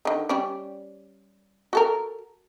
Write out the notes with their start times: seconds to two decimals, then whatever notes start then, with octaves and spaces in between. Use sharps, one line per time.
0.05 D3 D#3
0.29 G3 C#4 D5
1.73 F#4 A4 A#4